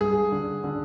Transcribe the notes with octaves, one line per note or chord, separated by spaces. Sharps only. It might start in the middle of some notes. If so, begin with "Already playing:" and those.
G2 G#4
D3
D3